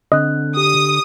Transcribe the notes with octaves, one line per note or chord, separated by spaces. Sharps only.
D3 C4 D#5 F#6
G4 D#6